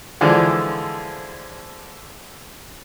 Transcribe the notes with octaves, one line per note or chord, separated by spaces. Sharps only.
D3 E3 F3 G#3 D5